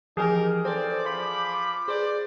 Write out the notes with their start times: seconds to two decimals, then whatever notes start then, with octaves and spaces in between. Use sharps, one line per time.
0.17 E3 F3 D#4 G4 G#4 A#4
0.65 E3 C4 A4 C5 D5 D6
1.05 F3 B5 C6 G6 B6
1.88 G#4 B4 C5 D5